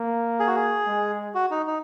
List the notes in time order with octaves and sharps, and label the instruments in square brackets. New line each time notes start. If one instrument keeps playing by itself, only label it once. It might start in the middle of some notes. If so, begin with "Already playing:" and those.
Already playing: [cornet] A#3
[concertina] G#4
F#4
G#4
[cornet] G#3
[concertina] F#4
D#4
D#4